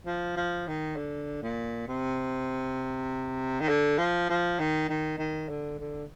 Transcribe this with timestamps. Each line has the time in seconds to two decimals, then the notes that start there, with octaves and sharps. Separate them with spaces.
0.06 F3
0.36 F3
0.68 D#3
0.96 D3
1.43 A#2
1.88 C3
3.61 D#3
3.69 D3
3.98 F3
4.29 F3
4.59 D#3
4.89 D#3
5.18 D#3
5.49 D3
5.80 D3